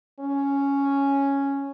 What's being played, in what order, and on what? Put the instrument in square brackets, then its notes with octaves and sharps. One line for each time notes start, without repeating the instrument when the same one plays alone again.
[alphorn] C#4